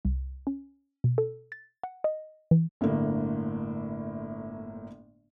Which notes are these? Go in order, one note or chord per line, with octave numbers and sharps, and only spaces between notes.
C2
C#4
B2
A4
A6
F#5
D#5
E3
G1 A2 D3 A#3